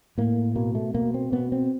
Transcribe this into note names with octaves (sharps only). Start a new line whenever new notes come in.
A2 A#3
B2 A#3
A3
B2 A#3
C4
B2 B3
C4